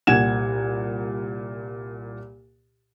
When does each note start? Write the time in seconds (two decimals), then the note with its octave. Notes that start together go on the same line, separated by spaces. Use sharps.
0.07 C2 A#2 F#5 G#6 E7